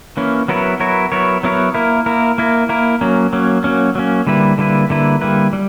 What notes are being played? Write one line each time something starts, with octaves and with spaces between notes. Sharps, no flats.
E3 A#3 C#4 E4
F#3 B3 E4 A#4 C#5
F#3 B3 E4 A#4 C#5
F#3 B3 E4 A#4 C#5
F#3 B3 E4 A#4 C#5
A#3 E4 A#4
A#3 E4 A#4
A#3 E4 A#4
A#3 E4 A#4
F#3 A#3 C#4
F#3 A#3 C#4
F#3 A#3 C#4
F#3 A#3 C#4
D3 G3 A#3 E4 B4
D3 G3 A#3 E4 B4
D3 G3 A#3 E4 B4
D3 G3 A#3 E4 B4
G3